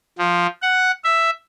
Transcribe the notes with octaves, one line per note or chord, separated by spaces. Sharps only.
F3
F#5
E5